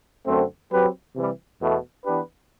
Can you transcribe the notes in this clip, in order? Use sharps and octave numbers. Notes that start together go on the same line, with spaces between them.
F#2 D3 A3 C4
F#3 C4 G4 B4
C3 E3 G3
E2 B2 A3
E3 B3 D4 G4 B4